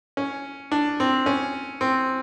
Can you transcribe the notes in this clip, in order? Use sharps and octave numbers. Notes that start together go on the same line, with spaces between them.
C#4
D4
C4
C#4
C4